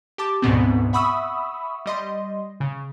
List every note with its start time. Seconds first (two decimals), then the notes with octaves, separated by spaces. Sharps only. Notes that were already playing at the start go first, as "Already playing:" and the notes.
0.18 G4 A5 D6
0.42 D2 G#2 B2 B3 C4
0.93 E5 F#5 B5 C#6 D#6 E6
1.86 G3 D#5 C6
2.60 C#3